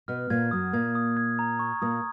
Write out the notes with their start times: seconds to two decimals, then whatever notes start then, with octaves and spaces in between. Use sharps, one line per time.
0.08 B2 B3 F6
0.30 A#2 A#3 G#6
0.51 F#2 F#3 D#6
0.73 A#2 A#3 G#6
0.95 D#6
1.17 G#6
1.39 A#5
1.59 C#6
1.82 A#2 A#3 D#6